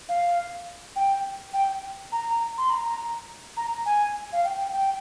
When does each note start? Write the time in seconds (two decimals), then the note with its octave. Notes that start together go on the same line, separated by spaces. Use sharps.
0.09 F5
0.96 G5
1.53 G5
2.12 A#5
2.58 C6
2.70 A#5
3.57 A#5
3.86 G#5
4.33 F5
4.44 G5
4.58 G5
4.72 G5